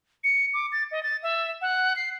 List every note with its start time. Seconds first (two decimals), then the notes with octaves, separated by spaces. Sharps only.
0.24 C#7
0.54 D6
0.72 A6
0.91 D#5
1.03 A6
1.23 E5
1.61 F#5
1.96 C7